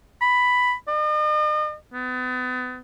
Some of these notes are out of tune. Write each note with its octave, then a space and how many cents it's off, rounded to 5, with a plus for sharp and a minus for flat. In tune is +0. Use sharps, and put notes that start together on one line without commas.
B5 +5
D#5 -45
B3 +35